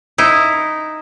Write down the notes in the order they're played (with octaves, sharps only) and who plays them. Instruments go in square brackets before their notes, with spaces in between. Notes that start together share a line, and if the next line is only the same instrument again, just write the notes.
[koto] D#4 E4